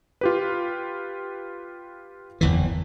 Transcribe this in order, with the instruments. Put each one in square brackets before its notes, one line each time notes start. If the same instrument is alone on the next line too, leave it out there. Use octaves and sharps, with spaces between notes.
[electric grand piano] F4 G4 B4
[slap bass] F#1 E2 E3